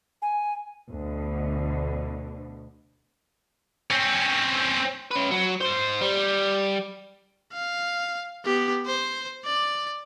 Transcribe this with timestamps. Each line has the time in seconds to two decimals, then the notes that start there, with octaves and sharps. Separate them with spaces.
0.22 G#5
0.90 D2 B2 D3
3.91 C4 C#4
5.11 C#4 B4
5.31 F#3
5.61 G#2 C5
6.01 G3
7.53 F5
8.45 B3 G4
8.86 C5
9.45 D5